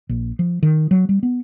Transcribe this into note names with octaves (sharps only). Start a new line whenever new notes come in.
A#1
F3
D#3
F#3
G3
B3